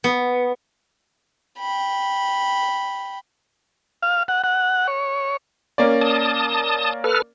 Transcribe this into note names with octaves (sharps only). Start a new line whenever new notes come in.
B3
G5 B5
F5
F#5
F#5
C#5
A#3 C#4 D5
A5 D#6
A4 B4 F6